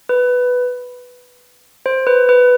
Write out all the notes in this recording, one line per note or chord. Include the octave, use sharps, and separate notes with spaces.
B4
C5
B4
B4